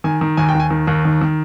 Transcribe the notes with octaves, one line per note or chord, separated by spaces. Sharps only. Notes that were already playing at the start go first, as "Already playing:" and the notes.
D#3 G#5
D#3
D#2 G#5
G5
D#2
G#5
D#3
D#2
D#3
D#3